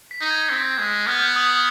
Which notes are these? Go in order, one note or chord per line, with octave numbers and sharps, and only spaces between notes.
B6
D#4
G#6
C4 B6
G#3 G6
B3 F6
G6
D#6
D#6